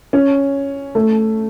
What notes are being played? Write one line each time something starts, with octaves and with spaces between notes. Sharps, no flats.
C#4
A3